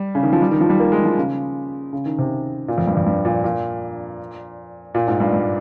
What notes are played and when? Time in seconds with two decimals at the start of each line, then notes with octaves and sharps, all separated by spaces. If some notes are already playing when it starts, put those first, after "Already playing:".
Already playing: G3
0.15 C#3
0.23 D#3
0.33 F3
0.42 G3
0.51 D#3
0.61 F3
0.70 G3
0.80 A#3
0.92 G#3
1.05 F3
1.18 C#3
1.93 C#3
2.06 D#3
2.18 C3
2.68 A#2
2.78 F2
2.87 G2
2.97 F2
3.06 G2
3.25 A#2
3.44 A#2
4.95 A#2
5.07 G#2
5.20 G2
5.33 G2